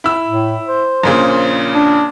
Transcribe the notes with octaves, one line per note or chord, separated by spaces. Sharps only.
E4 E6
A2
C5
A#1 A#2 C#3
D4